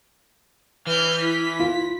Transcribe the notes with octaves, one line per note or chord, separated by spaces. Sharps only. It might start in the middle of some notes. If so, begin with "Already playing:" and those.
E3 B4 F6 G6
E4 B6
F4